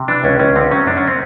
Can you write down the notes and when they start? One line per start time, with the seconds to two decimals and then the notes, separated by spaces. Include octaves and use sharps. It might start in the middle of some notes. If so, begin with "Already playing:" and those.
Already playing: C3
0.08 E3 D4
0.24 C#2 C#4
0.39 C#2 C#4
0.55 D3 C4
0.71 F#3 C#4
0.86 F#2 D4
0.97 C#4
1.08 C4